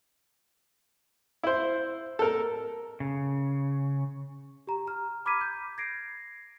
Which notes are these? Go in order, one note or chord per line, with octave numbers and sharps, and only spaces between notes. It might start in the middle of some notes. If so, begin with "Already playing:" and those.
E4 C5
A4 A#4
C#3
G4 A#5
A#5 F6
B5 D6 F6 G#6 B6 D#7
G6
G#6 A#6 C7 D7